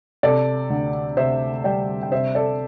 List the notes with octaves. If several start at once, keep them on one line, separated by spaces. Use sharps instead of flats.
C3 A4 D5
D2
C3 C5 E5
G3 D5 G5
G5
C3 C5 E5
A4 D5